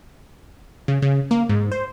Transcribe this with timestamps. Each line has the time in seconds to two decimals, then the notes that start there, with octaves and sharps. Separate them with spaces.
0.88 C#3
1.02 C#3
1.31 A#3
1.49 G#2
1.72 C5